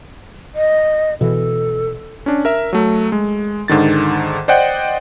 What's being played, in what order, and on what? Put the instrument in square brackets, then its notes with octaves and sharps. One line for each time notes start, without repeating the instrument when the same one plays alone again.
[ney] D#5
[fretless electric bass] B2 E3 [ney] A4
[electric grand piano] C#4 D4
A#4 E5
F#3 A3
G#3
G#2 D3 D#3 A6
C5 D5 D#5 F#5 G5